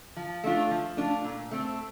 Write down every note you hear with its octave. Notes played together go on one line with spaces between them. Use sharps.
F3
A3 D4 F4
F3
A3 D4 F4
A#2
A3 C4